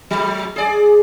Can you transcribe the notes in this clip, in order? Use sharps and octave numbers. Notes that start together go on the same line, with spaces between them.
F#3
G#4 D5